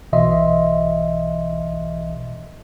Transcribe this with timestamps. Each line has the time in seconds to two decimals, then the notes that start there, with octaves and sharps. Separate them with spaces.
0.12 B1 B2 E3 D#5 E5 C6